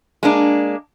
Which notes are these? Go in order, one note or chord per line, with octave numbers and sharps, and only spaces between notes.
G#3 A#3 D4